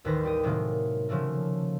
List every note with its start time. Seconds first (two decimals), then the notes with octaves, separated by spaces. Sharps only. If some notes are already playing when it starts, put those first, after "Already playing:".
0.04 A1 D#2 D#3 B4 C5 A#6
0.23 G3 G4 D#6
0.43 A2 C3 D#3 F#3 G#3 A#3
1.09 C#3 F3 F#3 A3 A#3